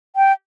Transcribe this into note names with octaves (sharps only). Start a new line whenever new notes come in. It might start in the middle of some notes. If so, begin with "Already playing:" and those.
G5